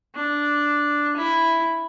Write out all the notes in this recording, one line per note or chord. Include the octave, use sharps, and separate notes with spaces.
D4
E4